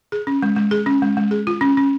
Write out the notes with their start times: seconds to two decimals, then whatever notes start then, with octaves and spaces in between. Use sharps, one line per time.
0.12 G#4
0.27 C#4
0.42 G#3
0.56 G#3
0.71 G#4
0.86 C#4
1.02 G#3
1.17 G#3
1.31 G#4
1.47 F4
1.61 C#4
1.77 C#4